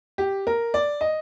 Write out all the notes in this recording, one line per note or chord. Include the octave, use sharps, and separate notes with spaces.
G4
A#4
D5
D#5